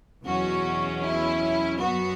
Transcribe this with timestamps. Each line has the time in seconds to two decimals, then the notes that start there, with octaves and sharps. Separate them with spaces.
0.24 E2 B2 F#3 C#4 F#4
1.02 E4
1.78 F#2 F#3 B3 F#4